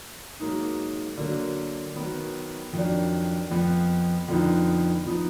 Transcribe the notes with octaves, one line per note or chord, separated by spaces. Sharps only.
G#2 F#3 A#3 D#4
D3 F#3 A#3
D#3 F#3 B3
F2 D#3 F#3 D4
F2 F3 B3
F2 D3 F3 B3 D#4
F3 B3 D#4